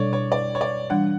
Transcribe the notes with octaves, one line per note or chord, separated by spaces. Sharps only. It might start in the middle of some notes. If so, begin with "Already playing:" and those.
Already playing: B2 G3 D4 A4 C#5 D5
C#5
D5
C#5
D5
E3 G3 D4 F#5